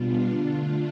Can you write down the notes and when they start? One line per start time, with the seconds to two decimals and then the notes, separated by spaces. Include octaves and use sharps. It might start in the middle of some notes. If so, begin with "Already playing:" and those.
Already playing: B2 G3 B3 D4 F4
0.27 D3 A3 D4 F4